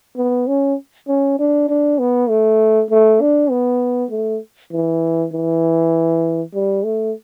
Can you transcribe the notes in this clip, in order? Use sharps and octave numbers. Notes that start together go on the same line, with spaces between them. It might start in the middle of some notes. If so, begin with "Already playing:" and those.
B3
C#4
C#4
D4
D4
B3
A3
A3
D4
B3
A3
E3
E3
G3
A3